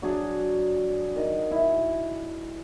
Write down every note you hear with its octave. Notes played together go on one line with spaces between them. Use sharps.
F#3 D4 G#4
D#3 D#5 F#5
E4